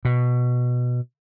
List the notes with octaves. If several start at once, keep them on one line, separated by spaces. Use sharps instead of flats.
B2